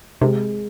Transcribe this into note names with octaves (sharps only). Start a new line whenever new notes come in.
C3 G#3